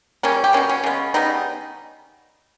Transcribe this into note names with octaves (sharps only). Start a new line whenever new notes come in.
C#3 G3 A#3 C#4
G4
B2 A#3 C#4
C#4
C#3 G#3 B3
C#3 G3 B3 D#4